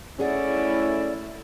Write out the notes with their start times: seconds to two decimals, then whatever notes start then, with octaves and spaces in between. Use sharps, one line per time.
0.19 A3 C#4 E4 G#4 D5 F#5